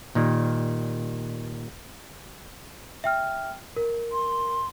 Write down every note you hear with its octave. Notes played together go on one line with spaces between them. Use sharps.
A#2 D#3 G3
E5 G5 F6
A#4
C6